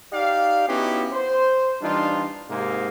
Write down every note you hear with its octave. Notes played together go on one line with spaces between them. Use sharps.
D#4 G4 D5 F5
B3 C#4 D#4 E4 F#4 G4
C5
E3 G3 D4 D#4 F4
G#2 C3 A#3